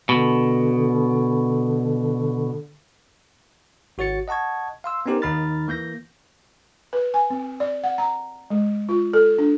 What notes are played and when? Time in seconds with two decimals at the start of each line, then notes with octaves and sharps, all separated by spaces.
0.09 B2 D3
3.98 G#1 F#4 C#5 A6 C#7
4.28 D#5 F#5 A5 C#6 G#6
4.84 F5 C6 E6
5.06 B3 C#4 D#4 G4 A#4 C5
5.22 D#2 D#3 D#4 B5 F6 A6
5.68 E3 A#3 G6 A#6
6.93 B4
7.14 G#5
7.30 C4
7.60 D5
7.83 F#5
7.98 A#5
8.50 G#3
8.89 F4
9.13 A4
9.38 D4